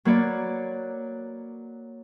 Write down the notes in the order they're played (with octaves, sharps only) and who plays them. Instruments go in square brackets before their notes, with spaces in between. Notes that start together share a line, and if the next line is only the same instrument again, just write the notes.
[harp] F#3 A#3 B4 C#5 D5